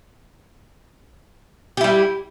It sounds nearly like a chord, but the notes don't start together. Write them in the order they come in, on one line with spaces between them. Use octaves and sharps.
G4 E4 G3